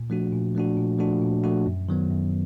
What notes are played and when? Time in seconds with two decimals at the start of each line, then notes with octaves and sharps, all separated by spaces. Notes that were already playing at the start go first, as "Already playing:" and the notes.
Already playing: A#2
0.10 F3 A3 D4 F#4
0.32 A#2
0.55 F3 A3 D4 F#4
0.77 A#2
0.99 F3 A3 D4 F#4
1.22 A#2
1.44 F3 A3 D4 F#4
1.66 F#2
1.89 D#3 F#3 B3
2.10 F#2